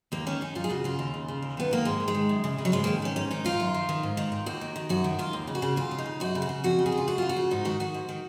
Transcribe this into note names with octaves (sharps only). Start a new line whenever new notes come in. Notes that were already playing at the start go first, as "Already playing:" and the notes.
D#2 A#3
D#3 C#4
D#3 D#4
F#2 F4
G#4
C#3 F#4
C#3 F4
D#2
C#3
C#3
D#2
D#3 B3
D#3 A#3
G#2 G#3
D#3
G#3
D#3
F#2
C#3
C#3
F#3
G#2 G#3
D#3 A#3
D#3 C#4
G#2 C#4
D#3 D#4
D#3 F4
F#2
D#3
D#3
G#2
D#3
D#3
D#2 F#4
D#3
D#3
F#2 F#4
D#3
D#3 F4
D#2
C#3
F#4
C#3
D#2 F4
C#3
D#4
C#3
F#2 F#4
C#3
F#4
C#3
F2 F#4
C#3
G#4
C#3
F4
F#2 F#4
C#3 F4
F#4
C#3
G#2 D#4
D#3 F#4
D#3 F#4
G#2
D#3